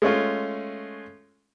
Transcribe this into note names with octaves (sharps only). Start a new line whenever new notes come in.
G#3 A3 C#4 F4